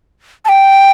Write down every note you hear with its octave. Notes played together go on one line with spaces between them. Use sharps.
A5
G5